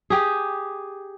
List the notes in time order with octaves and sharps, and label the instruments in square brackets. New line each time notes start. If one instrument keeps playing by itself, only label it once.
[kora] G4 G#4